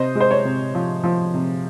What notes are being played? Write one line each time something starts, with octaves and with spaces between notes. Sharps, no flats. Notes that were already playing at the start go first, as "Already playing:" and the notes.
Already playing: C3 C5 D#5
G#3
C5
C#5
C3
F3
F3
C3